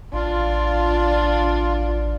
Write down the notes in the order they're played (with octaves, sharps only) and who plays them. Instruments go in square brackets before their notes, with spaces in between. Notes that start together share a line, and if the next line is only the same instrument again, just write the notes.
[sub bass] A1 [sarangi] D4 [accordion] F4